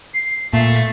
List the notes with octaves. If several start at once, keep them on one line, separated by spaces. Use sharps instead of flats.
C7
A#2 A3 C#6